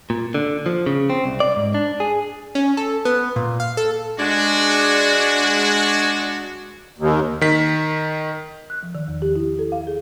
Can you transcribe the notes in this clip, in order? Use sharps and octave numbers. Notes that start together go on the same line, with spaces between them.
A#2
D3
F3
C#3
C4
C2
D5
G#2
D4
G#4
C#4
A4
B3
A#2
F5
A4
G#3 D4 F#4
D#2
D#3 B6
F#6
F3
D#3
E2
G4
E4
A4
F5
G#4